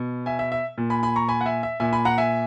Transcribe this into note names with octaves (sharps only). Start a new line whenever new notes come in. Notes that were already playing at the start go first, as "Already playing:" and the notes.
Already playing: B2
E5 G#5
E5
E5
A#2
G#5 B5
G#5 B5
A#5 C#6
G#5 B5
F#5
E5 G#5
E5
A#2 E5 G#5
G#5 B5
F#5 A#5
E5 G#5